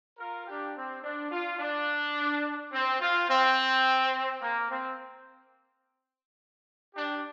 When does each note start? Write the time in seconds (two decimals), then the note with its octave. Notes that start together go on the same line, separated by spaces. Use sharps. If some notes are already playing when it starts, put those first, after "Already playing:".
0.19 F4 A#4
0.46 D4 G4
0.75 C4
1.02 D4
1.31 F4
1.59 D4
2.72 C4
3.00 F4
3.28 C4
4.41 A#3
4.70 C4
6.95 D4 G4